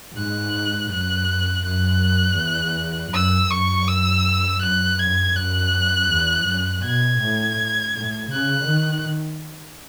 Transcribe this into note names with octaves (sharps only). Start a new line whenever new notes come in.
G#2 F#6
F#2 F#6
F#2 F#6
E2
F#2 E6
F#2 C#6
E6
F#2 F#6
F#2 G#6
F#2 F#6
E2
F#2
B2 G#6
A2
A2
C#3 F#6
D#3